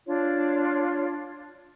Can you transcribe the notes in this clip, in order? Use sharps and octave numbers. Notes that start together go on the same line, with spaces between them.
D4 F4 C#5